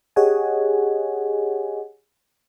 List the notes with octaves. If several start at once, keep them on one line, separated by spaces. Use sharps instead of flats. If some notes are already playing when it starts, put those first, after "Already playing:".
G4 G#4 C#5 D#5 F#5 G#5